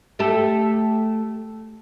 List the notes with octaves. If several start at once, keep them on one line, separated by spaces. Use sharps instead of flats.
A3 G4 A4